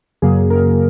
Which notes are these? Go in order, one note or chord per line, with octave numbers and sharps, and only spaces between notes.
F#2 C#3 F#3 A#3 G#4
A#4